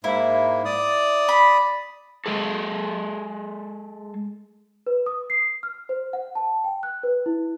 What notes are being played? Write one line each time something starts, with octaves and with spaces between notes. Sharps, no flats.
G#2 A#3 E4
D5 D#6
B5
G#3 G#4 A4
B4
D#6
C7
F6
C5
F#5
A5
G5
F#6
B4
E4